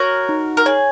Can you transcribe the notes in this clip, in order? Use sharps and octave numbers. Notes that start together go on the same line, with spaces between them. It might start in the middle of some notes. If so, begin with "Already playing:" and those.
Already playing: F#4 A#4 C#5
D#4
A#4
G#4 C#5